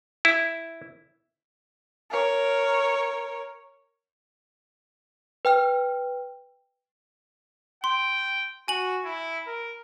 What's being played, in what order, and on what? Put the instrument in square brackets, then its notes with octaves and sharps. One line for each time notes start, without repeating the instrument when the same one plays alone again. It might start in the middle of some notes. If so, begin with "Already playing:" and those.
[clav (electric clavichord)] E4
[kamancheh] A#4 C#5
[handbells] B4 G5 F6
[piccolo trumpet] G5 [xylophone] C6
[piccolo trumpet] F#4 [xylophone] G#5 F#7
[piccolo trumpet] E4
A#4